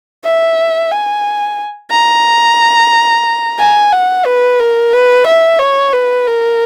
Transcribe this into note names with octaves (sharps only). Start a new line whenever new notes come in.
E5
G#5
A#5
G#5
F#5
B4
A#4
B4
E5
C#5
B4
A#4